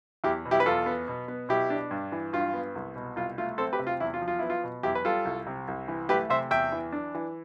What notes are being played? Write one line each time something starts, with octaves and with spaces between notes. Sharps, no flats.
E2 E4 G4
B2
E4 G4
B4
E2 F4 A4
B3
B2
B3
B2 E4 G4
D4
G2
E3
G2 F4
B3
C2
B2
C2 F4
A3 F4
C4 A4 C5
G4 B4
C3
F4
E2 E4
F4
F3
F4
B3 E4
F4
B2
E2 E4 G4
B4
G3 F4 A4
C2
C3
C2
E3
A3 G4 B4
C3 C5 E5
E2 E5 G5
E3
D4
E3